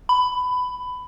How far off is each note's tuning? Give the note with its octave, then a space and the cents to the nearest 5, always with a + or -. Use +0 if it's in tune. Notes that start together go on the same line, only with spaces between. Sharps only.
B5 +15